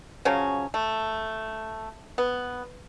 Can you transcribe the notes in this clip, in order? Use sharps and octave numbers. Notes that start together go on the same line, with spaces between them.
C#3 F3 F#3 C#4
A3
B3